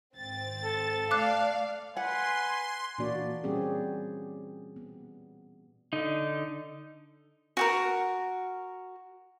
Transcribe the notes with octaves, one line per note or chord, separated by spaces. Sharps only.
G#1 C4 A6
A4
A3 D5 F5 D6 F#6
B4 F#5 G#5 C6
A#2 E3 A#3 D4 F#4 D5
A#2 G3 C4 C#4 G4 G#4
B3
D3 D#4
F#4 G4 A#4